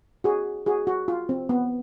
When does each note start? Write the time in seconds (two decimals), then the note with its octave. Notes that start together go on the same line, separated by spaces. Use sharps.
0.24 F#4 G#4
0.66 F#4 G#4
0.87 F#4
1.08 F4
1.29 C4
1.49 B3